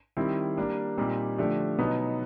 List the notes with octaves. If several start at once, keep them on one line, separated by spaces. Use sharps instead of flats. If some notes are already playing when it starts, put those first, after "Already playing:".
D#3 G3 C4 E4
G3 A#3 D4
A#2 G3 C4 D#4 G4
D3 F3 A3 D4 G4
B2 F#3 B3 D#4